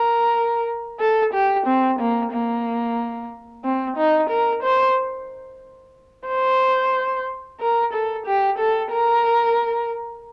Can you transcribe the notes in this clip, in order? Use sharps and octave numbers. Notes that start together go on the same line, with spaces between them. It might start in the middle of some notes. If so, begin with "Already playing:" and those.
Already playing: A#4
A4
G4
C4
A#3
A#3
C4
D#4
A#4
C5
C5
A#4
A4
G4
A4
A#4